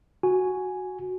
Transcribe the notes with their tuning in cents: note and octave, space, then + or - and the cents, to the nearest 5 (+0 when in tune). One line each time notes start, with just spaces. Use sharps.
F#4 +0 G#5 +0